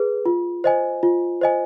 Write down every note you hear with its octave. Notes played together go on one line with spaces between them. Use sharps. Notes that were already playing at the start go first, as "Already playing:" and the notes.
Already playing: G#4 B4
F4
C5 D#5 G#5
F4
C5 D#5 G#5